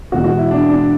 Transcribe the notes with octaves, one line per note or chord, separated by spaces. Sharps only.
E2 B2 G#3 F#4
F#4
E4
D4
D4